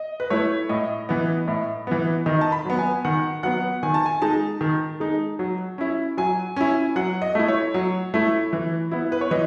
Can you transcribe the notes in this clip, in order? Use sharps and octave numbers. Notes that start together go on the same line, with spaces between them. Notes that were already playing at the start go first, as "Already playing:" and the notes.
Already playing: D#5
B4
A3 E4 C#5
A2 D#5
E3 B3
A2
E3 B3
D#3 D#5
A5
B5
F#3 B3
G#5
D#3 F#5
F#3 B3 F#5
D#3 G#5
A5
G#5
G#3 D#4 A5
D#3
G#3 D#4
F#3
C#4 E4
F#3 G#5
C#4 E4 G#5
F#3 F#5
D#5
A3 E4
C#5
F#3
A3 E4
E3
B3 E4
B4
C#5
E3 D#5